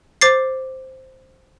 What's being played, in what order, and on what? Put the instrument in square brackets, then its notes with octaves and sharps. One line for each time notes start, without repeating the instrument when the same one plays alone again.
[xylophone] C5 D6 A6 C7